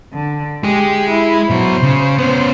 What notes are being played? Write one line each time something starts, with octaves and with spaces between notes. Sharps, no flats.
D3
G#3 G4 G#4
E4
B2 F#3 C5
C#3
B3 C#4 C5